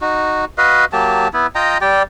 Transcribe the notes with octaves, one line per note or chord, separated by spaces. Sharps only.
D#4 F#4
F#4 B4 D#5 F5
F#3 A#3 G4 A5
B3 E4
F4 D#5 G5 A#5
G3 G4 D5 G5